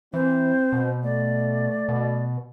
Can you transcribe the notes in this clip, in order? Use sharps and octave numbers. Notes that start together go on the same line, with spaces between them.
E3 C4 C5
B2
A3 D5
B2